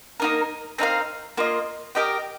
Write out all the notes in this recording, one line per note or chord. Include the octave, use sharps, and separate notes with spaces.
A#3 D#4 A#4
C4 D#4 A#4 F5
A#3 F4 D#5
G4 A#4 D#5 G5